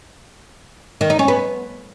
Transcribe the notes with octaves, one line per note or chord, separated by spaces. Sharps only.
D#3
D#4
C#4
B3